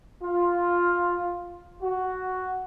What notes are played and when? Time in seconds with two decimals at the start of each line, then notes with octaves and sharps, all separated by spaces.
0.23 F4
1.83 F#4